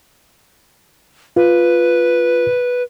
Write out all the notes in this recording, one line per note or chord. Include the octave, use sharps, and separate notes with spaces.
F4 B4